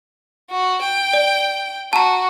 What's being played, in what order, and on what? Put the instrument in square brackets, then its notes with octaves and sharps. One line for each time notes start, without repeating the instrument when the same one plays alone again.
[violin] F#4
G5
[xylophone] D5
[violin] F#4 [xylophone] A5 A#5